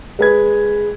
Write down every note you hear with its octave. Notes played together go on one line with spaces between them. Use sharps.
G#3 B4 G#6